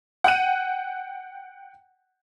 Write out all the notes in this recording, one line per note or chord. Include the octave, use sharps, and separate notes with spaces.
F#5 G5 F#6 D#7